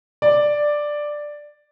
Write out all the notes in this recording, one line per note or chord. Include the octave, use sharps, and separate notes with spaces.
D5